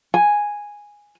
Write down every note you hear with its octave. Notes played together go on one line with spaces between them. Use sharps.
G#5